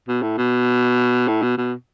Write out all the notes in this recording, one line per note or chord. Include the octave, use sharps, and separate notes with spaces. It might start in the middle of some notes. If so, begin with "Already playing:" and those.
B2
A2
B2
A2
B2
B2